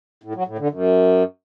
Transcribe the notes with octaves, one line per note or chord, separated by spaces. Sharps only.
A2
F#3
A2
D3
F#2